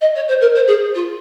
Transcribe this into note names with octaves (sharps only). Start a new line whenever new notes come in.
D#5
C#5
C5
A#4
C5
G#4
F4